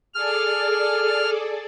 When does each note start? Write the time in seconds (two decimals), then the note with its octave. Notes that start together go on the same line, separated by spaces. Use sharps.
0.14 G#4 A4 D5 F6